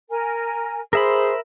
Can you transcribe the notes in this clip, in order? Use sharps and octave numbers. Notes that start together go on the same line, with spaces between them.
A#4 G#5
G#4 A#4 C5 E5 B5